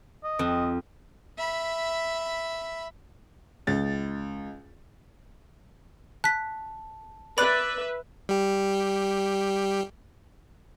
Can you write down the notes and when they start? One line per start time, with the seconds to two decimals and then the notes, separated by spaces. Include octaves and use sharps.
0.24 D#5
0.39 F2
1.38 E5 B5
3.67 C#2 A6
6.24 A5 F#6 B6
7.38 B4 D5 E5 B5 F#6
8.29 G3 G4